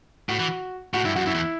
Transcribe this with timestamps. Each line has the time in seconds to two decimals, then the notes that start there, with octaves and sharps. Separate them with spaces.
0.29 A2 F#4
0.39 E3
0.94 A2 F#4
1.04 G2 E4
1.15 F#2 F#4
1.26 F#2 E4
1.34 E2